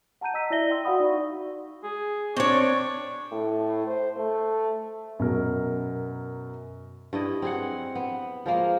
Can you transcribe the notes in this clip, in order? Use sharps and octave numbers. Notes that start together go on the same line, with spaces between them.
F#5 A5 A#5 G6 D#7
D#5 A#5 E6 B6
E4 D5 E5 A#6 G7
G5 C6 E6
F#4 D5 F5 F#5 B5 D#6
D#4 D5 C#6
G#4
C4 D4 C#5 C#6
A2
C5
A3
F#2 B2 A#4
G2 E4 D#5
C4 G#4 F#5
B3
F3 G#3 A#3